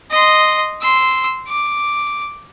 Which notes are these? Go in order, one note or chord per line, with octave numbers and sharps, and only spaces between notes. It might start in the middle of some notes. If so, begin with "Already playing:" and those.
D#5 C6
C6 E6
D6